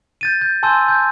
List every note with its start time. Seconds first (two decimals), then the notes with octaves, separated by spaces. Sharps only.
0.21 G6 A6 D#7
0.41 G6
0.63 G#5 A5 C6 E6 G6
0.88 G6